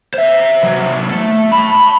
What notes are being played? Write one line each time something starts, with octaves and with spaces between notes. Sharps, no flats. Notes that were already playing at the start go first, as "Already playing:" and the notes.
C5 E5
C3 F#3
A3
A5 B5